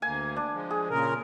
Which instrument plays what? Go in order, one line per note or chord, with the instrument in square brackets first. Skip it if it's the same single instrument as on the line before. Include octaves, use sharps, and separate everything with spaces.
[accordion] D2 A#3 [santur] G#5
[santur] D4
[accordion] F3 G#3
[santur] G#4
[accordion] A#2 C#3 A#4